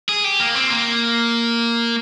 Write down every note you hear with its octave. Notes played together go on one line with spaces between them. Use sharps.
G#4
G4
A#3
C4
A#3